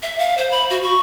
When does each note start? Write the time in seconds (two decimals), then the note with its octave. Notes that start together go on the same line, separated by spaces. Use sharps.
0.03 E5
0.19 F5
0.38 C5
0.51 B5
0.70 F#4
0.83 C#6